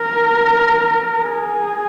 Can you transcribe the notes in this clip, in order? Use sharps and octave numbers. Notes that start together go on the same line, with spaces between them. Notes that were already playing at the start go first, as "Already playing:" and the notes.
Already playing: A#4
G#4